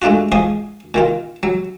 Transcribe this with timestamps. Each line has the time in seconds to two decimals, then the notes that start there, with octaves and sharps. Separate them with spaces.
0.02 G#3 A3 D4 F4 F#4
0.32 G#2 F3 G#5 C6 D#6
0.94 A#2 D#3 F4
1.43 F#3